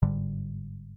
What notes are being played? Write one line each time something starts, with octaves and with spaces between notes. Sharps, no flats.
G1 G#2 D3 G3